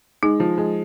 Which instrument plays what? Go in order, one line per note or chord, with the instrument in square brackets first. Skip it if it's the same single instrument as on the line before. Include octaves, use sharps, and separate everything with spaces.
[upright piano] G#3 [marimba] D#4
[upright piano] F3
G#3